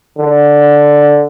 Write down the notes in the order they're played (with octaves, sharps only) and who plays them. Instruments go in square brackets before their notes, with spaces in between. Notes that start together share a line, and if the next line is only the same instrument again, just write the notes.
[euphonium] D3